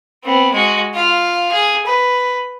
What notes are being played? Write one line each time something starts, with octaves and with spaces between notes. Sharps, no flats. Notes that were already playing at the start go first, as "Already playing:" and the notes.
B3 C4
G#3 F#4
F4 F5
G#4
B4